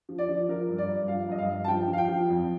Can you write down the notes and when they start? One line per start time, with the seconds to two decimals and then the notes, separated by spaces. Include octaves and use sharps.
0.09 F3
0.18 D5
0.29 F3
0.49 F3 A#4
0.69 G2
0.78 D5
0.89 G2
1.08 F3 F5
1.29 G2 D#5
1.38 F5
1.48 G2
1.64 A5
1.68 F3 G5
1.88 F3
1.93 F5
1.98 G5
2.08 F3
2.29 F2